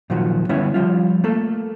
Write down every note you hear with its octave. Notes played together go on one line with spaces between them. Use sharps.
A#2 D#3 F3 F#3 F#4
D3 G3 B3 C#4 E4 C#5
F3 G3 F4
A3 A#3 A4